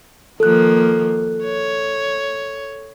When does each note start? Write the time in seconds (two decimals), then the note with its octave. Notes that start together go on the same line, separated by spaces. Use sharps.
0.40 D#3 F3 A#3 A4 F#6
1.44 C#5